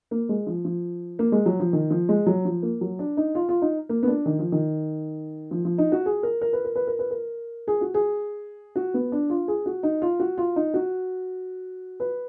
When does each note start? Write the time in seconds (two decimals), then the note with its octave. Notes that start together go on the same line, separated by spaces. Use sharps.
0.11 A#3
0.29 G#3
0.47 F3
0.65 F3
1.19 A#3
1.32 G#3
1.46 F#3
1.60 F3
1.73 D#3
1.90 F3
2.09 G#3
2.27 F#3
2.45 F3
2.63 A#3
2.81 F#3
2.99 D4
3.17 D#4
3.35 F4
3.49 F4
3.62 D#4
3.89 A#3
4.03 B3
4.08 D4
4.26 D#3
4.39 F3
4.52 D#3
5.51 F3
5.65 F3
5.78 D#4
5.92 F#4
6.06 G#4
6.23 A#4
6.41 A#4
6.53 B4
6.65 A#4
6.76 B4
6.87 A#4
6.99 B4
7.11 A#4
7.68 G#4
7.81 F#4
7.94 G#4
8.76 F#4
8.94 B3
9.12 D4
9.30 F4
9.48 G#4
9.66 F#4
9.83 D#4
10.02 F4
10.20 F#4
10.38 F4
10.56 D#4
10.74 F#4
12.00 B4